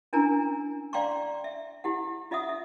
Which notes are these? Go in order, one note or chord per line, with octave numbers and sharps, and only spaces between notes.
C#4 D4 E4 A#4 G#5 A#5
D5 F5 G5 A#5 C6 C#6
E5
E4 G4 F#5
F4 D#5 E5 F#5 D#6
E5